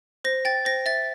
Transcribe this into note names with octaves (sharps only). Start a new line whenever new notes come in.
C5 A#6
G5 A6
C5 A#6
E5 A6